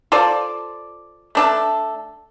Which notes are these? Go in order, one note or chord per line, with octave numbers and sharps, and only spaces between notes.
F4 A4 C5 D5
A3 D4 A4